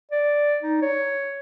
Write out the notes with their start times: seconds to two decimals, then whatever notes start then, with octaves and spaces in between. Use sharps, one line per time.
0.11 D5
0.62 D#4
0.82 C#5